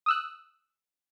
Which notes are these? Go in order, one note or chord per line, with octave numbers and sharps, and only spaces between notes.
D#6 E6 F#6